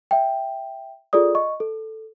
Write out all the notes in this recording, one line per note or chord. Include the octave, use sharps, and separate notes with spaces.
E5 G5
F4 G#4 A4 D5 D#6
D#5 C#6
A4